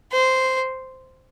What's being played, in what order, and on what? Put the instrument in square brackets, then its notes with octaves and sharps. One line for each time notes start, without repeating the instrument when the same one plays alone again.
[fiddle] C5